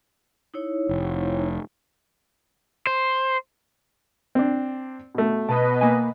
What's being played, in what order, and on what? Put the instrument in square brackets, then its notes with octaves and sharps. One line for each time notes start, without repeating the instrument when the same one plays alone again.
[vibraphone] D#4 E4 C#5
[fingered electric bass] F1
[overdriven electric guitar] C5
[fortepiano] C4 D4
B2 A3
[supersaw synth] B2 B4 D#5 [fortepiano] A5
[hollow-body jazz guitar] A#3 G#5